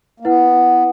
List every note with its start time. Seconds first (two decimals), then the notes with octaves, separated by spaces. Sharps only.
0.20 A#3
0.25 B3 E4 B4 F#5